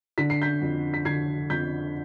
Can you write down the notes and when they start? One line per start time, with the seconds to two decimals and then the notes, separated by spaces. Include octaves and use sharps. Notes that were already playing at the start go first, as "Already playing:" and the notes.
0.18 D3 B6
0.30 C7
0.42 G6 B6
0.62 F2
0.94 B6
1.05 D3 G#6 C7
1.50 F2 G6 B6